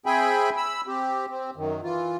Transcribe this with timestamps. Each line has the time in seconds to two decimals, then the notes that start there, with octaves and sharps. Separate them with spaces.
0.06 C4 G#4 E5 G5 G#5 B5
0.57 B5 E6
0.87 C4 G4
1.29 C4
1.57 F#2 D#3
1.83 E3 F4